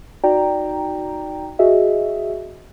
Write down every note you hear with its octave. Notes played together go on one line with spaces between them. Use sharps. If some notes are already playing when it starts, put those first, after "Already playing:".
D#4 F#4 D5 G5 A#5
F#4 G#4 D#5 E5